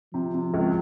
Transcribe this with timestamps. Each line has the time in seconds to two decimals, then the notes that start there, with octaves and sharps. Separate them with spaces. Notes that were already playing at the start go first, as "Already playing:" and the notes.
0.14 C3 F3
0.34 C3
0.54 C#2